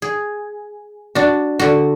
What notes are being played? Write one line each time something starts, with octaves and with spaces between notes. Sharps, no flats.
G#4
D4 F#4
D3 F#4